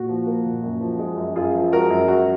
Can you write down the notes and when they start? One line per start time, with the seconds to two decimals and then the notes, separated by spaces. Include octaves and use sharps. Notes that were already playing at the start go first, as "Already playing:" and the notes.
Already playing: A#2 F#4
0.09 F3
0.27 A#3
0.46 A#2
0.63 F#2
0.81 F3
0.99 G#3
1.17 F#2
1.35 F#2 F4 G#4
1.55 F3
1.72 G#3 F#4 A#4
1.90 F#2
2.08 F#2 F#4